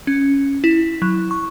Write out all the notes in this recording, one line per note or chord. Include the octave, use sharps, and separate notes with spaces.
C#4
E4
F#3
C#6